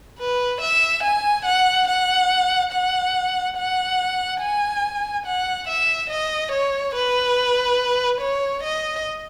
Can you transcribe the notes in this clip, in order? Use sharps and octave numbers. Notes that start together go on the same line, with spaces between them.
B4
E5
G#5
F#5
F#5
F#5
F#5
G#5
F#5
E5
D#5
C#5
B4
C#5
D#5